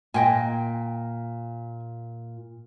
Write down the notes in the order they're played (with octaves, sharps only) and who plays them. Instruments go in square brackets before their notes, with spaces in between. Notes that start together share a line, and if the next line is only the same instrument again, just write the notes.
[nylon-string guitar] A#2 [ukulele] D#5 G5 G#5